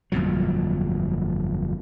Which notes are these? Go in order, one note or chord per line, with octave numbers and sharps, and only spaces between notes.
G1 F2 A#2 F#3